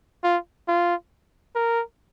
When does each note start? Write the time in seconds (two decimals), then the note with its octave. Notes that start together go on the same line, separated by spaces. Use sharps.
0.24 F4
0.68 F4
1.55 A#4